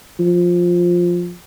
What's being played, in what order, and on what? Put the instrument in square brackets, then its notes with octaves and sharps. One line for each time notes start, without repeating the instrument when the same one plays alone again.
[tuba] F3